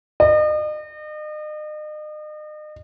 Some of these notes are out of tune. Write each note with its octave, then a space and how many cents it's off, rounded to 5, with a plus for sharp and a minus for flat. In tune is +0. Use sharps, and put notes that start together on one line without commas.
D#5 -40